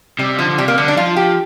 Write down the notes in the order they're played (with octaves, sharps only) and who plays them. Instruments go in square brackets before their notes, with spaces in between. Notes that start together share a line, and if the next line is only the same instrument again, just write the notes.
[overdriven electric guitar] C3 [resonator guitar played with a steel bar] G3
[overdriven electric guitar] D3 [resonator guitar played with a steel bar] F3
[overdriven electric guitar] D3
[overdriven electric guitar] C3 [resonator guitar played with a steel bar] G3
[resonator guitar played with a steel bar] A#3
[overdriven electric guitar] D3 [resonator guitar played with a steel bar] G3
[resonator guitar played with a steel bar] D4
[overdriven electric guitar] D3
[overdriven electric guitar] F3 [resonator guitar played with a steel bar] F4
[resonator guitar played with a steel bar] G4